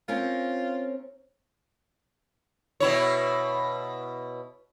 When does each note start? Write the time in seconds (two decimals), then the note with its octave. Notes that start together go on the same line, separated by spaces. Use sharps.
0.08 C4 C#4 F4 A#4
2.80 B2 E4 C#5